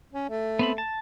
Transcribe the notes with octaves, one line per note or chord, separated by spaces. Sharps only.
C#4
A3
B3 C4 B5
A5